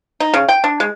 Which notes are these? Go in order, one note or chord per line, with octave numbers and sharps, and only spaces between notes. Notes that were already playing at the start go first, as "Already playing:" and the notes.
D#4
C#3
G5
D4
G#3